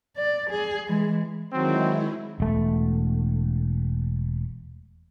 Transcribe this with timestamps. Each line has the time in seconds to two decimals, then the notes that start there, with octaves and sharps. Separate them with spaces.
0.17 D5
0.50 G#4
0.87 E3 G#3
1.53 D#3 F#3 G#3 C4 E4
2.40 E1 A3